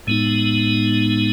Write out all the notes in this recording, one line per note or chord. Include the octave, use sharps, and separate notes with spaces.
A2 G#3 B3 D#4